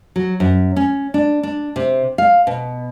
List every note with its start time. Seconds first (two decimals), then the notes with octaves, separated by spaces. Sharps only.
0.16 F#3
0.40 F#2
0.76 C#4
1.14 D4
1.43 D4
1.76 C3
2.18 F5
2.47 B2